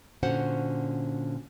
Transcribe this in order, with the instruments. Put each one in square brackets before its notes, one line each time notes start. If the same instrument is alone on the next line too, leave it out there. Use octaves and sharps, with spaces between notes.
[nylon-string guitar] A#2 D3 C#4 F#4 C5 F#5